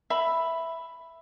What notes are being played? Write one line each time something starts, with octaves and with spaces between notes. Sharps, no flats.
E5 B5